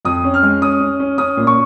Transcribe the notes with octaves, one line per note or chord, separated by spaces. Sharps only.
F2 D#6
C#4
F6
G#3
C#4 D#6
C#4
C#4
C#4 D#6
A#2
C#6